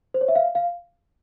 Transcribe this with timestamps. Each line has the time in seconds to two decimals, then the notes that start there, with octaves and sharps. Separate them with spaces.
0.14 C5
0.21 C#5
0.28 E5
0.35 F5
0.55 F5